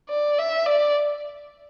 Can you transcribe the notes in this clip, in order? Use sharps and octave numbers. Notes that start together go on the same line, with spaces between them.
D5
E5
D5